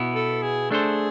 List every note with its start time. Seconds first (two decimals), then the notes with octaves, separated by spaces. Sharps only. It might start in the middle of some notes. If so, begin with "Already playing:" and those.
Already playing: B2 B3 E4
0.15 A4
0.42 G#4
0.71 A3 D4 G#4 A4 C5